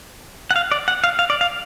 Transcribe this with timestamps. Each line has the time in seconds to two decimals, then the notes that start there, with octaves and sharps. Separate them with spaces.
0.51 F#5
0.56 F5
0.71 D5
0.88 F#5
1.04 F5
1.19 F5
1.30 D5
1.41 F5